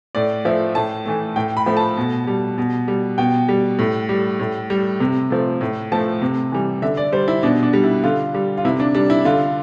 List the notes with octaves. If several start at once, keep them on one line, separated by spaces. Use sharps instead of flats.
A2 D5
F3 A3 E5
A2 A5
E3 A3
A2 G5
B5
F3 A3
A5
B2
G3
B2
G3
B2 G5
G3
A2
G3
A2
G3
C3
F3 A3
A2
F3 A3 A5
C3
E3 G3
D3 E5
D5
G3 C5
E4
B2 D4
D4
G3
E4
D3 F4
G3
F4
C3 E4
D4
G3 D4
E4
D3 F4